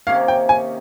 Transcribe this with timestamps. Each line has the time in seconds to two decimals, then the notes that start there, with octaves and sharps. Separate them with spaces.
0.07 C3 D#3 A#3 C#4 F5
0.28 G5
0.49 G#5